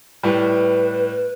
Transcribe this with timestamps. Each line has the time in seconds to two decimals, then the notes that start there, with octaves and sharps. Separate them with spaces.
0.23 A2 G3 B4